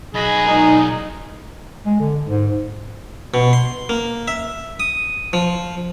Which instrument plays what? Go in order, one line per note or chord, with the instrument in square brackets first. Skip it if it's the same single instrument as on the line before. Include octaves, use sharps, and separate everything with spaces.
[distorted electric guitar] B1 F#4 [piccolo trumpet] G#4 [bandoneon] D#5 B5
[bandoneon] A#2 G#3 A#4 [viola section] D#4
[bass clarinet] G#3
D3
G#2
[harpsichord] B2
C6
A#3
E5
D#6
F3